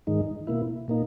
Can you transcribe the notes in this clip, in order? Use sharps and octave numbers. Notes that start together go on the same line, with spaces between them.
G#2 D#3 G#3 D#4
B2 A#3 E4
A#2 A#3 D#4